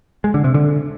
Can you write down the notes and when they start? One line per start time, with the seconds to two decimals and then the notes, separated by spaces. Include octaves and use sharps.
0.24 G#3
0.34 D3
0.44 C3
0.54 D3